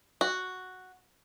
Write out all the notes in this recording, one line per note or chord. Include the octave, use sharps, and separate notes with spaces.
F#4